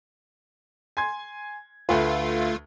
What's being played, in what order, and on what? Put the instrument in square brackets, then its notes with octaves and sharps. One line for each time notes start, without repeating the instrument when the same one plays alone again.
[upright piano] G#5 C6 G#6
[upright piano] D2 B4 [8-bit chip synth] A3 F4